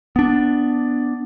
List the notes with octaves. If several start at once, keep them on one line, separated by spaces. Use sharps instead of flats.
B3 D4